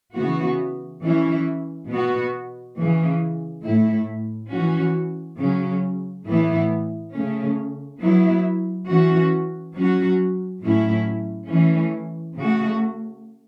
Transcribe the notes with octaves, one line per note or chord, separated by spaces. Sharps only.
C#3 E3 B3 F#4
E3 C#4 E4
B2 B3 F#4
C#3 E3 C#4
A2 A3 E4
E3 C#4 F#4
C#3 F#3 C#4
A2 E3 B3 E4
C#3 A3 C#4
F#3 B3 E4
E3 C#4 F#4
F#3 C#4 F#4
A2 F#3 C#4 E4
E3 A3 C#4
C#3 A3 F#4